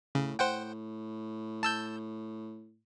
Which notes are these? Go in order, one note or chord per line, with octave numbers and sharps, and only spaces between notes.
A2 C#3
A2 C5 F#5 G5
A5 E6 G6